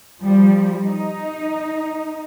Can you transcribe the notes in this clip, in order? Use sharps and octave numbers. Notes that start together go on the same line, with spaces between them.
F3 G3
D#4